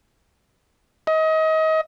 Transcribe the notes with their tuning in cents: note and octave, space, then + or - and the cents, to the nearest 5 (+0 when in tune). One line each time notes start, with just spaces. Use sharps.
D#5 +30